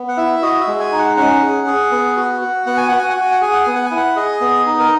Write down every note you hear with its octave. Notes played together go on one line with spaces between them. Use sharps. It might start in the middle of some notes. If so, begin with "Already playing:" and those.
Already playing: B3
F#5
E4 E5
F#4 D#5
E5
G#3
G#5
D#4
F#5
C#4 F#5
G#4
G#4
B3
F#4
F#4
B3 F#5
G#5
F#4 F#5
G#5
F#5
F#4 G#5
F#5
G#4 G#5
F#5
B3 G#5
F#5
G#5
E4
F#5
G#4 D#5
B3
D#4
A#4